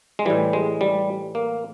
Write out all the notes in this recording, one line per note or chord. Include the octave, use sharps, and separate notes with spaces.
G#3
A2 E3 G3
G#3
G3
A#3